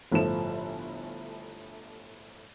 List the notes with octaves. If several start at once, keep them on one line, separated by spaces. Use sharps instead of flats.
G1 A2 F3 A4 E7